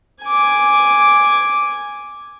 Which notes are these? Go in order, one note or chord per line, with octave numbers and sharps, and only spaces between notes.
G#5 D6